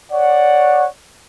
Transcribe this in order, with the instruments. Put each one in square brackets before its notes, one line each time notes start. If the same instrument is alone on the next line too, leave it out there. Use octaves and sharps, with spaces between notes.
[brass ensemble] C#5 D5 F#5